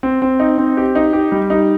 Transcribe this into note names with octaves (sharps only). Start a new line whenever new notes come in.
C4
C4
D#4
C4
G4
D#4
G4
G3
D#4